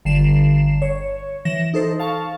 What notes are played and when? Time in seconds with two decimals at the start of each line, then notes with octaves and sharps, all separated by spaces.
0.05 G1 D3 C7 E7
0.82 C#5
1.45 E3 A#6 E7
1.74 D#4 A4 C5
1.99 F5 A5 C#6